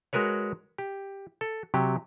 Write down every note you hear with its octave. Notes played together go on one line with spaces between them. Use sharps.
G#3 F#4 A#4 B4 C#5
G4
A4
C3 F#3 G4